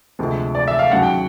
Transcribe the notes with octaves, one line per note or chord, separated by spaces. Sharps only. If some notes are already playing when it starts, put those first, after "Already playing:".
D2 C3 F3 G#3
D5
E5
F5
D#2 C#3 F#3 F#5
G5